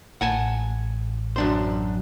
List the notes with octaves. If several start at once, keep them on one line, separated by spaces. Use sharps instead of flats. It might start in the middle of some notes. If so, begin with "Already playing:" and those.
A1 F#5 G#5 A5
F#2 D4 C5